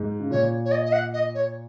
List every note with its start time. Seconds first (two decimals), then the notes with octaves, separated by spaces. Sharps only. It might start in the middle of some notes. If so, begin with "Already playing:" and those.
Already playing: G#2
0.20 C#3
0.30 A#2 C#5
0.65 C#5
0.71 D#5
0.85 D#5
0.92 F#5
1.13 D#5
1.35 C#5